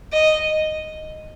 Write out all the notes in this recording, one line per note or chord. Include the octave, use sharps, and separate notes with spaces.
D#5